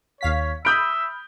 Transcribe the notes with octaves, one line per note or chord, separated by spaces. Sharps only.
D#2 C#5 F5 B6
E5 B5 D#6 F6 G6 D7